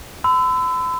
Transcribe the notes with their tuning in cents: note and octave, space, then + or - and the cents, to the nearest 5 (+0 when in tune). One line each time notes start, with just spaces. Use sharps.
B5 +45 E6 +0